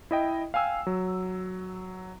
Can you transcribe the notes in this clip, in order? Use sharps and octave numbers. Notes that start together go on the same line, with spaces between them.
E4 D#5 G5
F5 G5 G#5 E6
F#3